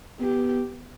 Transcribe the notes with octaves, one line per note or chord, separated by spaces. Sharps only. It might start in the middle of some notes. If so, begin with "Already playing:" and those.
B3 G4